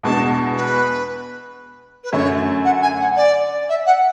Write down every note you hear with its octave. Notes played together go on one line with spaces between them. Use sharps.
E2 B2 G#3 D4 A5
B4
B4
F#2 D3 A3 C#5
F#5
G#5
F#5
D5
E5
F#5